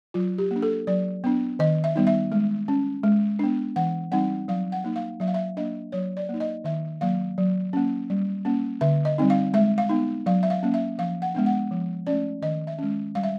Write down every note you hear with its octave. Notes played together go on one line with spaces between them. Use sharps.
F#3 F4
G4
A#3 D4
A4
F#3 D5
B3 D4
D#3 D#5
E5
G3 B3 D#4
E5
G#3
C#4
G#3
B3 D4
E3 F#5
G3 C4 D#4 F#5
F#3 F5
F#5
A#3 D#4
F5
F#3 E5
F5
E5
A#3 D4 D#5
F#3 C#5
D5
A#3 D#4
D#5
D#3 E5
F#3 A#3 F5
F#3
A#3 C#4
G3
A#3 C#4
D3 E5
D#5
G3 C4 D#4
F5
G#3 E5
F5
B3 D#4
F#3 F5
E5
F5
A#3 C#4
E5
F3 F5
F#5
G#3 B3 D4
F#5
F3
A3 C#4 D5
D#3 D#5
E5
G#3 C#4
G3 F5
E5